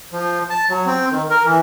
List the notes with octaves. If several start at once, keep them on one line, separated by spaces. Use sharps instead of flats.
F3
A5
F#3
C4
D#3
A#4
E3